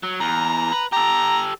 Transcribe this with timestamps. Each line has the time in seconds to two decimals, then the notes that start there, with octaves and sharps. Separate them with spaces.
0.03 F#3
0.20 E2 A#5
0.72 B4
0.92 G4 A4 A#5